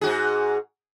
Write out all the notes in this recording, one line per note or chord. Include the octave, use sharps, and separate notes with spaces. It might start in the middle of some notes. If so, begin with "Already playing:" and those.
G#2 F#4 G#4